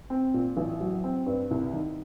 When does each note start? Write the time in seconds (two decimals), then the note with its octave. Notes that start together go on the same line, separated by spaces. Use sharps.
0.10 C4
0.34 A#2
0.57 A1
0.80 F#3
1.04 C4
1.26 G2
1.51 C2
1.73 D#3